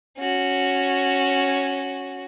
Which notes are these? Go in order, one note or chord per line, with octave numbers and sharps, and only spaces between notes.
C#4 F#4